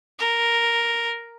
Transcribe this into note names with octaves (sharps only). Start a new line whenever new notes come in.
A#4